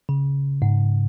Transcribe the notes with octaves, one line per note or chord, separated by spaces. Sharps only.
C#3
G#2